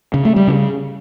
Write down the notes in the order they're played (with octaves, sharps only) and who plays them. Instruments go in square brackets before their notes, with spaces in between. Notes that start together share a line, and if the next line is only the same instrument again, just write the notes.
[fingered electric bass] C#3
A3
G3
C#3